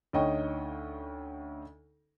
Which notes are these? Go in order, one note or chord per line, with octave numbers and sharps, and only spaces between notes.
D2 C#4 D#4 D#5 G5 C#6